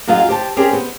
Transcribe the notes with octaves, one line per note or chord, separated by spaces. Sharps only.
F#2 F#3 F4 G#4 D#5 F5
G4 C5 A5
C4 C#4 G4 G#4 A#4
B3 C5